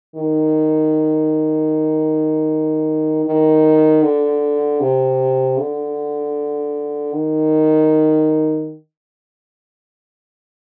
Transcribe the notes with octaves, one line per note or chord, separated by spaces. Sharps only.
D#3
D#3
D3
C3
D3
D#3